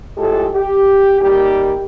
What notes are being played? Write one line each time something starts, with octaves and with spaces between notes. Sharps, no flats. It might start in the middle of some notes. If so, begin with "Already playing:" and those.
A2 G#3 F4 G4 A4
G4
D#3 G3 A#3 G4